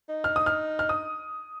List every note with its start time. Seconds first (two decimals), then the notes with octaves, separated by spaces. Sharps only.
0.09 D#4
0.24 F6
0.36 D#6
0.46 F6
0.79 F6
0.89 D#6